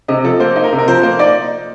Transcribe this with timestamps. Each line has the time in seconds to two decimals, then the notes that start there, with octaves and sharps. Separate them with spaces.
0.08 C3 D#5
0.25 F3 A4
0.40 A#3 C5
0.56 D#4
0.64 A#4
0.73 C3
0.79 A#4
0.88 F3 C5
1.03 A#3 C5
1.19 D#4 D5